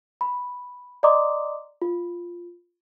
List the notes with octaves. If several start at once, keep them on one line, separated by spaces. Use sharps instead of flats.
B5
D5 D#5 A#5 C6 D6 D#6
F4